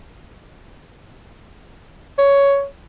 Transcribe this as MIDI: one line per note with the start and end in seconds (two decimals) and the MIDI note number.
2.18 2.65 73